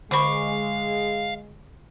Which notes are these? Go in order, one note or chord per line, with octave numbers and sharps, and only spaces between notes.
D3 G#3 C5 F5 B5 C#6 D6